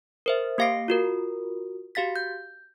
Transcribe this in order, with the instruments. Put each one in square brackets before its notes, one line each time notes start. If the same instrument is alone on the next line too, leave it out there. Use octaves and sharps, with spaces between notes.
[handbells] A#4 C5 E5
A#3 G4 F5 D6 C7 D7
F4 F#4 A#4
F#4 G4 F5 A6 B6
G6